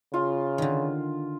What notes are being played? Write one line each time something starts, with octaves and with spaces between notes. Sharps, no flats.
C#3 F4
D3 D#3